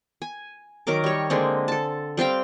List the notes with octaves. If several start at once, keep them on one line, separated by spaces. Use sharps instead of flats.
G#5
D#3 F#3 A#4 D6
G3 C#5
D3 G#3 A#3 C4
A4 A5
G3 C4 F5 G5